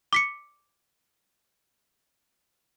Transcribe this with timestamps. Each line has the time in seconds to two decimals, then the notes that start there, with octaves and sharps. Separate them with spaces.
0.13 D6 B6 C#7